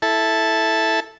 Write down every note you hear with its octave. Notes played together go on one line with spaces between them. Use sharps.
E4 A4 A5